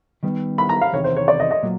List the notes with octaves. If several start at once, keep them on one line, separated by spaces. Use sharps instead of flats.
D#3 G3 B3 D#4
B5
A#5
F5
E2 C3 D#3 C#5
C5
C#5
D5
D#5
D#5
A#2 F#3